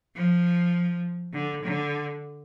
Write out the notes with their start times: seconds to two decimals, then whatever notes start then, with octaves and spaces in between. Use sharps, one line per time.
0.16 F3
1.33 D3
1.63 D3